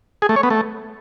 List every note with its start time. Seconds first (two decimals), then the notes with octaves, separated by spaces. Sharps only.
0.22 G#4
0.29 A3
0.36 C#5
0.43 B3
0.50 A3